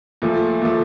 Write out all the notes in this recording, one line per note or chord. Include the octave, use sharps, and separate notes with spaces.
A#2 F3 A3
A#2 F3 A3